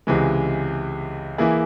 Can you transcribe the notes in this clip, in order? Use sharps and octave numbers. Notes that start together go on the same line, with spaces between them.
C#2 C3 E3 G#3
E3 A#3 E4 G#4